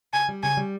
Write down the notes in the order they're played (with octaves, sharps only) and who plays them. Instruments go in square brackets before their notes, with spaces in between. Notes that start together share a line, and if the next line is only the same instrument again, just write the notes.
[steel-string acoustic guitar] C#3 [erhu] G#5
[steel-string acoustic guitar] G3
[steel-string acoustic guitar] C#3 [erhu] G#5
[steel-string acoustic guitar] G3